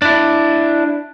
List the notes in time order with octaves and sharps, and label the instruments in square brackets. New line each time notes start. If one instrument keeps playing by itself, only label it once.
[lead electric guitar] D4 E4